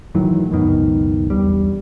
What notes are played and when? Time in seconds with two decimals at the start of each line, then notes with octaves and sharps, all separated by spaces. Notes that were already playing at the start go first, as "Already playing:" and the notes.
0.15 A2 D#3 E3 F#3
0.50 C#2 F#2 B2 D#3
1.30 E1 B1 G3